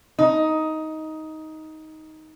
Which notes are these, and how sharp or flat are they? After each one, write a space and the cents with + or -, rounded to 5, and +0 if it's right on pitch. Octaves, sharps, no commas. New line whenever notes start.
D#4 +10